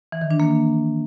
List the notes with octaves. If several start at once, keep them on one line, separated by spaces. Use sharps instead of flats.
E3
D#3
D4
A#3